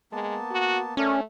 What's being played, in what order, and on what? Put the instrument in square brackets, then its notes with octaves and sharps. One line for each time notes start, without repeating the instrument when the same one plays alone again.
[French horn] G#3 [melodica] A#3 B3 A5
[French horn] F#4
[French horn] A3 [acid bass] C#4 [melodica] A4 A#4 D5